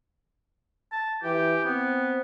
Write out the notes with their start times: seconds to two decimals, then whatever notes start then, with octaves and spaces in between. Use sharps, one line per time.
0.92 A5
1.23 E3 G4
1.65 B3 C4